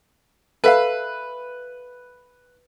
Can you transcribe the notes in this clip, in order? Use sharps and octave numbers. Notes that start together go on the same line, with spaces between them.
A4 B4 E5 F5